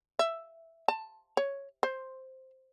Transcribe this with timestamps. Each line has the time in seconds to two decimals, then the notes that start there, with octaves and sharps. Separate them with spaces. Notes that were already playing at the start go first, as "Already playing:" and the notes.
0.19 E5
0.88 A5
1.37 C#5
1.83 C5